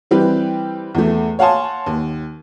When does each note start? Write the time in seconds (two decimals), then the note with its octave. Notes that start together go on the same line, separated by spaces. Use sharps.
0.11 E3 G3 C4 G4 B4
0.95 E2 A3
1.39 C#5 F5 F#5 G#5 A5 C6
1.86 D#2